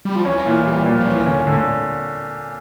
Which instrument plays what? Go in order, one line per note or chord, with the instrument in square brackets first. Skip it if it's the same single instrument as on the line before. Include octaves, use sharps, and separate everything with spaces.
[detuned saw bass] G3
F3
[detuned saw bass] E3 [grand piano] C#4
[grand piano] A#2
G3
A#2
[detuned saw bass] F3
[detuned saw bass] E3 [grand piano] C#4
[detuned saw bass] D3 [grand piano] C#4
[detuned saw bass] A2 [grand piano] D3